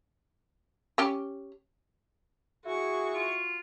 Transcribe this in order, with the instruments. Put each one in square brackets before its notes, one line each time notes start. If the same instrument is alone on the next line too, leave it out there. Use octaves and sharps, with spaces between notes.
[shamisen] C#4 G4
[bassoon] E4 [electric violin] F#4 C#6 [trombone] G#4
[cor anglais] F4